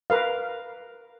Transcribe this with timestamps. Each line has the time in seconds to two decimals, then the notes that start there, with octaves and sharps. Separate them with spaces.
0.10 A#4 B4 F5